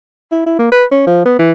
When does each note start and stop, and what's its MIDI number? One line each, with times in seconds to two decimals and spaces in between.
0.32 0.44 64
0.46 0.54 64
0.59 0.71 58
0.72 0.84 71
0.91 1.03 61
1.07 1.23 53
1.25 1.38 59
1.39 1.52 52